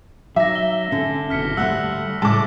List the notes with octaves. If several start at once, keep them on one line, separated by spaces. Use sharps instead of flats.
F#3 D#4 E5 D6 A#6
G7
D3 C#4
F#1 B2 F6 B6 C#7
D2 G3 A3 F#5 E6 F#6
A2 C#3 G#3 A5 D6